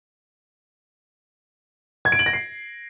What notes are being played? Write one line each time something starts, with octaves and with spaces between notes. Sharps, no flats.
G#6
D7
F#7
A#6
C7